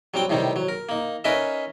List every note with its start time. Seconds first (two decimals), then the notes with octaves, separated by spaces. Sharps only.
0.14 F#3 G3 C4 G5
0.30 A2 C3 D#3 G3 C4
0.56 F#3
0.69 A#4
0.89 A#3 D#4
1.24 C#4 D#4 A#4 B4 D#5 E5